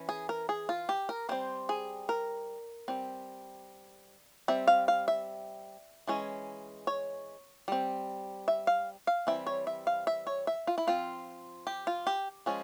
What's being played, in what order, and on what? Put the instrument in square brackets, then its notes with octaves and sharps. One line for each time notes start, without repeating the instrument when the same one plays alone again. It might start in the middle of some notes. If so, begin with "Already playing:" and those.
Already playing: [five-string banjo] E3 C#4
G#4
A#4
G#4
F4
G4
A#4
G3 C4 C5
G#4
A#4
G3 C4
G3 C4 E5
F5
F5
E5
E3 G#3 C#4
C#5
G3 C4
E5
F5
F5
E3 G3 C4 E5
C#5
E5
F5
E5
C#5
E5
F4
E4
F3 C4 F4
G4
F4
G4
F3 G#3 C#4